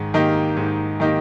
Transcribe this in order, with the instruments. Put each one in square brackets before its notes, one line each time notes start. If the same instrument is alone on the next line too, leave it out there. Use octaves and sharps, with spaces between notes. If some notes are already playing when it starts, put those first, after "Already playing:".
Already playing: [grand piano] G#2 D#3
D#3 A#3 D#4 G4
G#2
D#3 A#3 D#4 G4